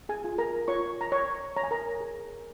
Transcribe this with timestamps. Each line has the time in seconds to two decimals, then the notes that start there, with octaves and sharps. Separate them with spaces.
0.09 G#4 G#5
0.24 F4
0.38 A#4 A#5
0.68 F4 C#5 C#6
1.01 A#5
1.12 C#5 C#6
1.56 C#5 A#5
1.63 G#5
1.71 A#4 A#5
2.00 G#4